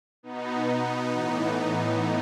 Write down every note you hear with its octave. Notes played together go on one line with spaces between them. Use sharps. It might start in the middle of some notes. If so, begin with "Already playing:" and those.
B2 B3 D#4
A2 E3